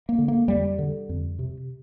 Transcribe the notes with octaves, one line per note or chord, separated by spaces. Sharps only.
A#3
D3
A#3
F2 G3
D3
F2
C3